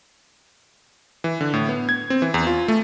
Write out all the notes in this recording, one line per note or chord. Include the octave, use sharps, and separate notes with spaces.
E3
D3
A2
B3
G#6
C4
E3
E2
F4
A3